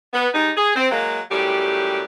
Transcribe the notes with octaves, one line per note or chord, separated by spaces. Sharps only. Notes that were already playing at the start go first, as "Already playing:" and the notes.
B3
G3 G#3 D#4
G#4
C4
F#3 G#3 A#3
F#2 A2 G3 G4